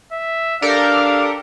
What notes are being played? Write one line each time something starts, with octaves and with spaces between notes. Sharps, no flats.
E5
D4 G4 A4 A#4 F5